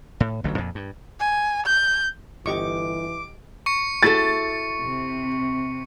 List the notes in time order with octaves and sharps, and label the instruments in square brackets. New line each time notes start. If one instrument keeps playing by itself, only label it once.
[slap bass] A2
A1 D3 D#3 F#3
F2 A#2
G2
[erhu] G#5
G6
[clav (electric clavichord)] G1 [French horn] E3 [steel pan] G4 D#5 C#6 [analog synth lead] D6
[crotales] C#6 C#7
[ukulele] E4 F#4 A4 [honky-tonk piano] A6
[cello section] C3